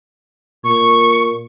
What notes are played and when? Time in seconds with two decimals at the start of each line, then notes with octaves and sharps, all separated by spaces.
0.64 A#2 C#6